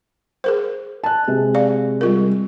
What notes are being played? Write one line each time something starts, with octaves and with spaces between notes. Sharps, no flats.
G#4 A#4 C5
A5 F#6
C3 G#3
D5 F5
G3 F4 A#4